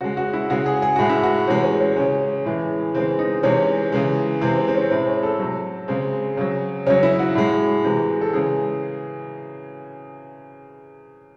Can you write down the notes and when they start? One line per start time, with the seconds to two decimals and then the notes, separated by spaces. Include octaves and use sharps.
0.01 C#3 G#3 F#4
0.17 F#4
0.33 E4
0.50 C#3 G#3 F#4
0.66 G#4
0.82 G#4
0.96 A2 G#3 F#4
1.09 E4
1.23 F#4
1.47 C3 E3 G#3 C#4
1.64 C#4
1.80 C#4
1.96 C#3 G#3 C#4
2.45 A2 E3 G#3
2.94 C#3 E3 G#3 C4
3.19 D#4
3.43 C3 E3 G#3 C#4
3.92 C#3 E3 G#3
4.41 C3 E3 G#3 C4
4.58 C4
4.68 C4
4.74 C#4
4.90 A2 G#3 C4
5.07 C#4
5.23 A4
5.39 C3 F#3
5.88 C#3 G#3 C4
6.37 C#3 F#3
6.86 C#3 F#3 C#4
7.03 E4
7.19 F#4
7.35 A2 G#3
7.84 C3 E3 G#3
8.21 A4
8.33 C#3 E3 G#3 G#4